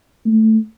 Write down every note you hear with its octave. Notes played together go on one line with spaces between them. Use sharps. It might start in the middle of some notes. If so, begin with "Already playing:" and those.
A3